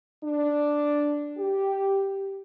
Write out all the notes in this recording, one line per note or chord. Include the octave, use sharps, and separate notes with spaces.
D4
G4